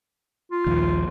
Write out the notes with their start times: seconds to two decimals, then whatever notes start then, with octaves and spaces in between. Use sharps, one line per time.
0.51 F4
0.67 A#1 D#2